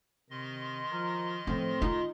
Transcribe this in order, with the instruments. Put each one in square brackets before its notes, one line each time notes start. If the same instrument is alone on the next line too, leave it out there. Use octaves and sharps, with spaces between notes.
[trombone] C3 [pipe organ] D#3 D#5 C6
[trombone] F3 [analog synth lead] A#4
[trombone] A2 [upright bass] F3 [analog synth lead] C4
[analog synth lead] D#4 [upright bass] F4